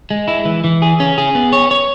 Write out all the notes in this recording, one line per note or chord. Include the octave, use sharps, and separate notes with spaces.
G#3
E4
E3
E3
G#4
C#4
G#4
B3
C#5
C#5